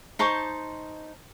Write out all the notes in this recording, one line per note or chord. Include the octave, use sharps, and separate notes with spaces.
D#4 C5 A5 C#6